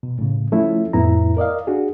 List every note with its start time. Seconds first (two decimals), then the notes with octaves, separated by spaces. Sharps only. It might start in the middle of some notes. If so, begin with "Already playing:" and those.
0.03 B2
0.19 A2 C#3
0.52 F3 A3 C#4 E4
0.93 F2 A2 B3 E4 A#5
1.37 A#4 D5 D#5 F5
1.67 D4 F#4 G#4